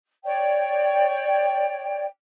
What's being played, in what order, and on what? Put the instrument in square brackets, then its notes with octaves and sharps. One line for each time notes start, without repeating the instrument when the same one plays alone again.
[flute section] C#5 D5 G5